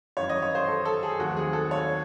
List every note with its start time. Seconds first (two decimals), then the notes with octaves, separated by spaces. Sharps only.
0.17 G#1 F#2 E3 C#5
0.29 D#5
0.42 C#5
0.55 C5
0.68 A4
0.85 A4
1.03 G#4
1.19 D#2 D#3 F#3 A3 C4 F#4
1.37 G#4
1.53 A4
1.71 C#5